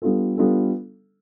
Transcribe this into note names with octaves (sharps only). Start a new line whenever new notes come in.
G3 B3 D4 F4 A4
G3 B3 D4 F4 A4